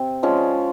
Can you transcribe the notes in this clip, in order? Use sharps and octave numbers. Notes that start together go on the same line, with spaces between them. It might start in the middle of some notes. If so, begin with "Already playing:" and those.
Already playing: C3 C4
F3 G#3 C#4